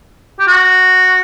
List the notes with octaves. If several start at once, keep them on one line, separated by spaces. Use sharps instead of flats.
G4
F#4